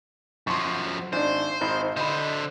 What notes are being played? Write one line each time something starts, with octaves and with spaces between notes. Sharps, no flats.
F#2 F3 C6 C#6
G#1 D4 C5
G#1 D#4 B5
D3 C5 D#5 B5